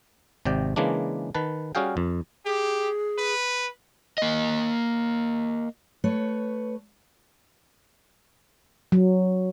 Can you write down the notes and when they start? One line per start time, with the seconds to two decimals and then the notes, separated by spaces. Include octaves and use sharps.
0.45 G#1 C3 D5 G5
0.76 C#3 E3 G#3 A#3 D4
1.35 D#3 B4 A5
1.75 G3 C#4 F#4 G#4 F5 G5
1.97 F2
2.46 G4 G#4
3.18 B4
4.18 A#3 D#5
6.04 A3 B4 C#5
8.92 F#3